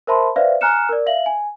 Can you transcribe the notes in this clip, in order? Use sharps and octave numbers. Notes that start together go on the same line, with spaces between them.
A#4 C5 E5 A5 B5 C6
B4 C5 D5 E5 F5
G#5 A#5 F6 F#6 C#7 E7
A#4 D5
E5 F5 F#7
G#5